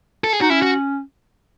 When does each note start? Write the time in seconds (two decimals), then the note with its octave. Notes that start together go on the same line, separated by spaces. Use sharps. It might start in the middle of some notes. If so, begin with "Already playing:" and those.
0.24 A4
0.33 G#4
0.41 D#4 F#4
0.50 C#4 E4
0.62 F#4